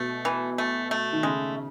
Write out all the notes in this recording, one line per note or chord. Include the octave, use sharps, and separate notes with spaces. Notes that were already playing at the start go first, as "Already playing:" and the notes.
Already playing: B2 A3
E3
A3
A3
D#3
C#3 G#3